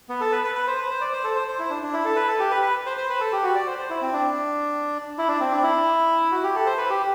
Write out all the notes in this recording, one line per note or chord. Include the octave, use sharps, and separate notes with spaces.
B3
A4
B4
B4
B4
C5
B4
C5
D5
C5
A4
C5
C5
E4
D4
D4
E4
A4
B4
A4
G4
B4
B4
C5
C5
B4
A4
G4
F#4
D5
C5
C5
E4
C4
D4
E4
D4
C4
D4
E4
F#4
G4
A4
C5
B4
G4